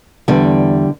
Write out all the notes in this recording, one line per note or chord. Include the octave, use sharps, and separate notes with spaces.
E2 D3 G3